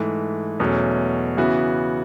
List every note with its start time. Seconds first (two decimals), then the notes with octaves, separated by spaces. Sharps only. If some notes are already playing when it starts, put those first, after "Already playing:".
Already playing: G#2 E3 A3
0.60 E2 B2 F#3 A3 C#4
1.37 C#3 E3 B3 F#4